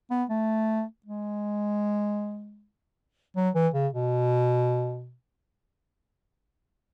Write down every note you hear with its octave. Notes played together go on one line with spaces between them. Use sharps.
B3
A3
G#3
F#3
E3
C#3
B2